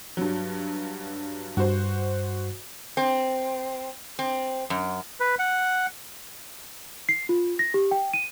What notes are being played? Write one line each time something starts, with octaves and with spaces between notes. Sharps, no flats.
G2 F#3
G2 F#4 C5
C4
C4
F#2
B4
F#5
C7
F4
A#6
G4
G5
D#7